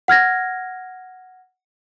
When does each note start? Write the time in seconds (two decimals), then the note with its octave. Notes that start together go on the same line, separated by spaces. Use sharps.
0.08 F#5 F6 G#6 A#6